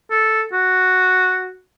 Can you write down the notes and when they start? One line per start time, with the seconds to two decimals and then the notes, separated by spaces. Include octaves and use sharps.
0.11 A4
0.53 F#4